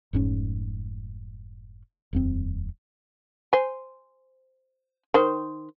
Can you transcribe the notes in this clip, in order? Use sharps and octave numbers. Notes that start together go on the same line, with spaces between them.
F1 G#2 C#4
D#1 F2 C4
C5 G#5
D#3 C5